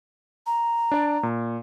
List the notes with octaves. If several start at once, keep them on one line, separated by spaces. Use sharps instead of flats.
A#5
D4 D5
A#2